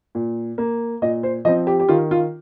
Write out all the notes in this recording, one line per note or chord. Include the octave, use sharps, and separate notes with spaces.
A#2
A#3
A#2 D#5
C5
F3 C4 D#5
G4
G4
D#3 F4
F4